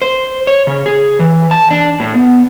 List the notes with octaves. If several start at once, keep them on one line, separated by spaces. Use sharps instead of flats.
C5
C#5
C#3
G#4
E3
A5
D4
A2
B3